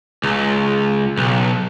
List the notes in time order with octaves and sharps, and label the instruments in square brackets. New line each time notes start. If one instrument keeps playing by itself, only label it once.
[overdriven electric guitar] C#2
B1